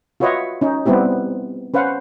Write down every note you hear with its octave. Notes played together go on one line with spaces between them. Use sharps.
F4 F#4 B4 C#5 D#5 E5
C#4 D#4
G3 B3 C4 E4 G4
C#4 B4 C5 F5 F#5